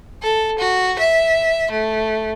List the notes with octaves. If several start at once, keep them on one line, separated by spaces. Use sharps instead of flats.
A4
F#4
E5
A3